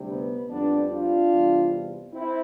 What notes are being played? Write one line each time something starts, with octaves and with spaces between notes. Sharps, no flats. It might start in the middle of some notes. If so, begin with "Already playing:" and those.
Already playing: D2 C3 G3
B3
F2 D3 G3 B3 D4
D4 F4
E2 C3 G3
C4 E4